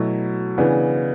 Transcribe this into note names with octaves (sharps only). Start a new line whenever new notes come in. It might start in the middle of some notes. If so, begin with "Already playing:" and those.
Already playing: B2 F#3 A3 E4
C#3 E3 B3 D4